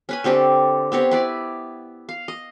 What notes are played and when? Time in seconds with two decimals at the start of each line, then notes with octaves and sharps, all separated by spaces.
0.09 C#4 B4 G#5
0.24 D3 C4 G4 A4
0.92 B3 C4 G4 C#5
1.11 E4 B4 D5
2.09 F5
2.28 D#5